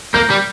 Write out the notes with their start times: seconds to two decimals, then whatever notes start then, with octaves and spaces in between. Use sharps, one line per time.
0.14 A#3 G6
0.30 G3